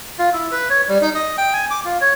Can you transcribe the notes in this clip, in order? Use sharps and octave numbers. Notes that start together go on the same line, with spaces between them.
F4
E4
B4
C#5
G3
D#4
D#5
G5
G#5
D6
F4
C#5